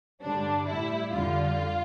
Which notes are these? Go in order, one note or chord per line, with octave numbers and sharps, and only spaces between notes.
G2 D3 G3 D4
A2 G3 E4
F2 D3 G3 F4